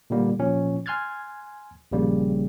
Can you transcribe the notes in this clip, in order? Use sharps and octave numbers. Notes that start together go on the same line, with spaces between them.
A#2 D3 G3 A#3
A#2 F3 C#4
G#5 C6 F6 F#6 G#6 A6
A#1 C#3 G3 A#3